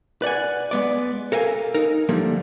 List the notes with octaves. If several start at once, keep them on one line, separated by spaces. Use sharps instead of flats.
B4 D5 F#5 G#5
G#3 B3 D5
A4 A#4 F5 G5 G#5
D#4 A#4
D3 F3 G3 A3 A#3